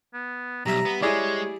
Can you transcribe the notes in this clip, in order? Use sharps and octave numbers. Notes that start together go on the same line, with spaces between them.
B3
B1 G3 E5 A#5
B3
G#3 E4 G#4 C#5 D5